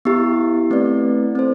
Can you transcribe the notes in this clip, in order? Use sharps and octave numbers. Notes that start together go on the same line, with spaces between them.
B3 E4 G4
A3 C4 E4 B4 D5
C4 E4 A4 C5